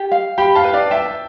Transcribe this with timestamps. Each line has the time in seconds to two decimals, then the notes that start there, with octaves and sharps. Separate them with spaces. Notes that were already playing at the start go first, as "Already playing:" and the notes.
Already playing: G4
0.12 F5
0.38 G4 G5 B5
0.55 F5 A5
0.64 B4
0.73 D5 F5
0.90 E5 G5 A5